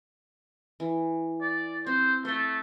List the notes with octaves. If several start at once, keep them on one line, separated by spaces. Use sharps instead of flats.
E3
D5
C4 C5
A3 C5 G5